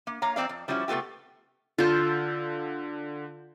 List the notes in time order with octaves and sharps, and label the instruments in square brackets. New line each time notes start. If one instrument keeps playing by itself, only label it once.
[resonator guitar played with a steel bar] A#3
A#3 C#5 F5 A#5
F2 A#3 C4 D5 F5
F2
F3 G3 C#4 E4 F#4
C3 A3 B3 F4 G4
[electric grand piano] D3 G6 [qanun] F4 A4